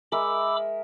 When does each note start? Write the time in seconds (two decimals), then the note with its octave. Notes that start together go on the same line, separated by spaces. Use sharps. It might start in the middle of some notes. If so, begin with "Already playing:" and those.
0.12 G#3 A#4 E5 B5 D6 E6